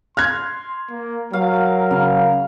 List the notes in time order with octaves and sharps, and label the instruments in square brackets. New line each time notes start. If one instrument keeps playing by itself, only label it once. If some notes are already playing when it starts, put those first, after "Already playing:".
[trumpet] C6 [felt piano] F6 F#6 G#6
[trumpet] A#3
[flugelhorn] F#3 [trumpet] A#4 [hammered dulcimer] F5
[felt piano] C#3 [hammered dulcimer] F5